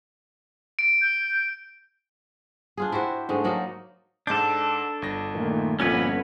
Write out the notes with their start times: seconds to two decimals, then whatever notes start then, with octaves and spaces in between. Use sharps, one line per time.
0.79 D7
1.02 G6
2.77 D4 F4 G#4
2.92 E4 F#4 G4 C5
3.29 G#2 D3 G#3 A3
3.44 F#3 A#3 D#4 D5
4.27 G#2 D4 A4 D6 G6
5.02 G1 A#6
5.34 A#2 D#3 A3
5.80 G1 F2 A#2 C#4 F#4 B4 G#6